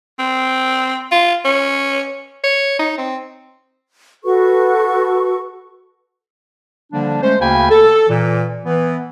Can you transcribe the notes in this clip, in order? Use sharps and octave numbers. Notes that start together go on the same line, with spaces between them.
C4
F4
C#4
C#5
D#4
C4
F#4 A4 B4 C#6
D3 F3 G3 A#3 D4
G#3 A3 C#4 C5
D2 C#3 A#3 G5 G#5 B5
A4
A#2 E3
E3 B3